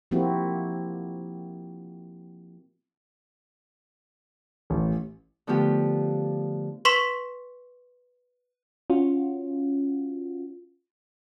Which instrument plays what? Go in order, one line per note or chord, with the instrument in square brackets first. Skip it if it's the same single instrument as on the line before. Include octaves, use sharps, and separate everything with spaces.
[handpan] F3 A#3 C4 E4 F#4 G4
[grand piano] A1
[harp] D3 F3 A3 B3 F4 G4
[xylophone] B4 C6 C#6 B6 E7
[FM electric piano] C#4 F4 F#4